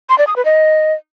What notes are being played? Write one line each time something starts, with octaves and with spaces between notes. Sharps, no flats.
C6
D5
D#6
B4
D#5